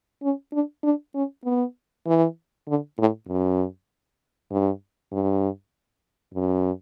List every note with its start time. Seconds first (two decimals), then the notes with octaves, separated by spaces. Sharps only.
0.23 C#4
0.52 D4
0.83 D4
1.15 C#4
1.45 B3
2.06 E3
2.68 D3
2.98 A2
3.28 F#2
4.51 G2
5.12 G2
6.34 F#2